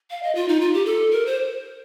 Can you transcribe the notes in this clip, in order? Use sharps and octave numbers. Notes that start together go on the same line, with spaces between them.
F5
D#5
F4
D#4
F4
G4
A4
A#4
C5